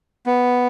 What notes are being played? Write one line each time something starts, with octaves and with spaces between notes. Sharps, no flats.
B3